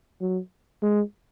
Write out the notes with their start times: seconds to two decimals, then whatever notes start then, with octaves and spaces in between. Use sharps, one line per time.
0.21 F#3
0.82 G#3